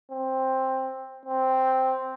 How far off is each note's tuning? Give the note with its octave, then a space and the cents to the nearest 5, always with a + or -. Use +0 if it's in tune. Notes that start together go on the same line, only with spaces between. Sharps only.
C4 +10
C4 -5